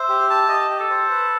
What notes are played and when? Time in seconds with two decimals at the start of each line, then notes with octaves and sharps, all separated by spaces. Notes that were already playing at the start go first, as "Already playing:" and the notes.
Already playing: C5 E5
0.09 G4
0.30 A5
0.49 G4 D#5
0.69 G4
0.80 A4
0.90 C5
1.10 B4